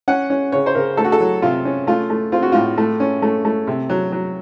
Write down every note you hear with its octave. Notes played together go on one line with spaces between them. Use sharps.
C#4 F#5
C#4
C#3 C#5
C5
C#3 A#4
A3 A4
F#4
A4
F#3
C3 F4
C#4
A3 F4
A3
C4 F4
F#4
A2 F4
A3
C#4
A3
A3
C3
F#3
F#3